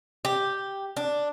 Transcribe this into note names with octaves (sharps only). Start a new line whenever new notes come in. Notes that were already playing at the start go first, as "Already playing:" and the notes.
G4
D4